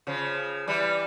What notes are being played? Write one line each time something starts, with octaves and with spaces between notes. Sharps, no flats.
C#3 F3
E3 G3